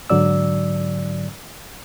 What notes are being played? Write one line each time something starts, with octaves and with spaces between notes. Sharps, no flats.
G#2 D3 F#3 D5 E6